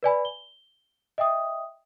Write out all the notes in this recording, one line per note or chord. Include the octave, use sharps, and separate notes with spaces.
B4 D5 G#5 B5
G7
D#5 E5 G5 D#6